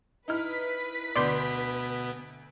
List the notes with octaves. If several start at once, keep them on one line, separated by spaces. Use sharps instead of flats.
D#4 E4 B4 F6 B6
D2 B2 B3 D5 C6 G6